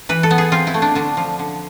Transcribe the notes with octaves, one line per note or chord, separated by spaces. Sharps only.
E3 B4
A4
B3
G#4
C4 F4
E4
A3
D4
D3 D4
F3
D3